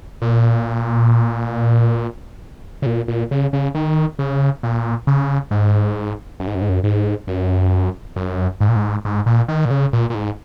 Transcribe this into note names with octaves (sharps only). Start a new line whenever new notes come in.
A#2
C#3
A#2
A#2
C#3
C#3
D#3
C#3
A#2
C#3
G#2
F#2
G#2
F#2
G#2
F#2
G#2
F#2
F#2
G#2
A#2
G#2
G#2
A#2
D#3
A#2
C#3
A#2
A#2
G#2